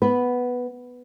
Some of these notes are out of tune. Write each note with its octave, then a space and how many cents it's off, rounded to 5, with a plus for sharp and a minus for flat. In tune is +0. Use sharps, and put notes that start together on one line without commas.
B3 +0 B4 +0